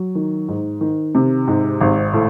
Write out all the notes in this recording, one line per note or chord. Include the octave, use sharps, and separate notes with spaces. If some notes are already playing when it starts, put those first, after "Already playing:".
Already playing: F#3
D#3
G#2
D#3
C3
G#2
G#1
A2